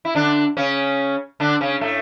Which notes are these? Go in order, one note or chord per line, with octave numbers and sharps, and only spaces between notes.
E4
D3 D4
C#3 C#4
D3 D4
C#3 C#4
A2 A3